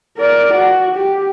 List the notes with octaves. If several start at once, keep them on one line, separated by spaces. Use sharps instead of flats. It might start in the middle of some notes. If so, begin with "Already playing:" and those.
A#4 D5
F#4
G4